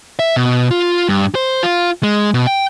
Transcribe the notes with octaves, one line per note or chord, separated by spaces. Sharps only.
E5
B2
F4
G2
C5
F4
G#3
B2
G5